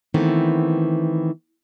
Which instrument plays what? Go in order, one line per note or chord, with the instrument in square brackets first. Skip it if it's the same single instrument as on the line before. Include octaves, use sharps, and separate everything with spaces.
[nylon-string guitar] D#3 E3 A3 B3 C4